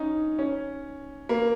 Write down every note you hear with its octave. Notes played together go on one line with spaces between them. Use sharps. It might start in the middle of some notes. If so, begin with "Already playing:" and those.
Already playing: C#4 D#4
C#4
A#3